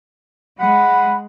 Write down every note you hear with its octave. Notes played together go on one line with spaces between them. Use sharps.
G#3 F#5 B5